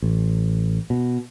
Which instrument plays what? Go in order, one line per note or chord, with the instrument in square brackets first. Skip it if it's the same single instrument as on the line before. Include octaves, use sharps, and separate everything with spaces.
[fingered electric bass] A1
B2